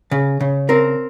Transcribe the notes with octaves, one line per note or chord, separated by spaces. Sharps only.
C#3
C#3
C4 A#4